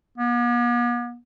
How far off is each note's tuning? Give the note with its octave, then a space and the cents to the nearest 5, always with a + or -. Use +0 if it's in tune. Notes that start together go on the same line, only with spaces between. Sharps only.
B3 -45